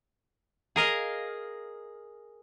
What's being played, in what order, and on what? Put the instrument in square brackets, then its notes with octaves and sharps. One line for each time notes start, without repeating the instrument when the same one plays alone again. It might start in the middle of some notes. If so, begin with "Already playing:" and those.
[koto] G#4 A#4 D#5 F5